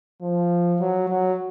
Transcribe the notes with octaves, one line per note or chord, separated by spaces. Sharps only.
F3
F#3
F#3